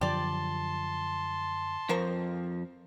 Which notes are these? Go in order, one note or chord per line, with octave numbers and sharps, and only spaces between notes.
F#2 D3 F3 G4 D5 A5 C6
F2 F3 A#4 C5 C#6